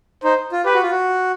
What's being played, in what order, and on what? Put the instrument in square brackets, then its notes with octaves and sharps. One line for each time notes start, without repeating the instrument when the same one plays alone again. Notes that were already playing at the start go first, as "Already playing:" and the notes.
[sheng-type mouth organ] D#4 [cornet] C5
[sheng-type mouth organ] F4
[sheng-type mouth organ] G4 [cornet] B4
[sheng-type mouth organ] F#4
F4
F#4